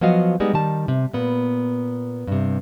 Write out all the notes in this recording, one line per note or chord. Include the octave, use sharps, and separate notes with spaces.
F3 F#3 B3 F#4 D#5 F5
G3 G#3 B3 D#4
D#3 G3 A5
C3
A#2 B3
G2 C3